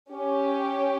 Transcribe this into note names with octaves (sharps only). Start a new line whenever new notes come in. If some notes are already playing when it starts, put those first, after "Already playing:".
C#4 G4